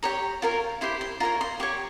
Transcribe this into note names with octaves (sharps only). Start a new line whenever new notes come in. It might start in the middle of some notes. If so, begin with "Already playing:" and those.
G4 C#5 A#5
F4 A#4 C#5
E4 G4 C5 C6
C6
F4 A#4 C#5 A#5
C6
G4 C#5 C#6